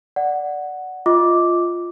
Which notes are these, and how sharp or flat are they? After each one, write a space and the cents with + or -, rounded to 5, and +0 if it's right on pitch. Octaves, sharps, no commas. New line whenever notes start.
D5 +0 F#5 +0
F4 +0 D#5 +20 D6 -5